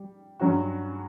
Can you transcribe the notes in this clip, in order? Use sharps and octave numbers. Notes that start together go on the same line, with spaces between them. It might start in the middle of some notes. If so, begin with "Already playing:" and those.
Already playing: G3
G2 F#3 C#4 F#4